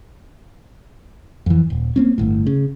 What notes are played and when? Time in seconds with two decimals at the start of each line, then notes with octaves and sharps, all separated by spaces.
1.46 F2 E3
1.70 D#1
1.96 A#3 C4 C#4
2.18 G1 A2
2.47 C#3